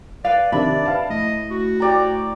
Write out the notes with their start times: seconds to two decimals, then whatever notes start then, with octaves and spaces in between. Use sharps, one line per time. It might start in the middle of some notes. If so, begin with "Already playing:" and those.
0.25 B4 D5 F5
0.52 C3 D#3 D4 E5 B5
0.86 B4 F5 A5
1.10 A2 D#5
1.51 F#4
1.80 G4 D5 A#5